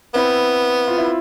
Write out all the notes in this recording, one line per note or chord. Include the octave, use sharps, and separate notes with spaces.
B3 C4 E4
F4
E4